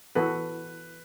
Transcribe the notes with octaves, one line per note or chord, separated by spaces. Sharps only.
E3 B3 F#4 A4 B4